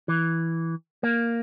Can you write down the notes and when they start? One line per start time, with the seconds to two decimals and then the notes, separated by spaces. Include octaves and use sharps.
0.08 E3
1.03 A#3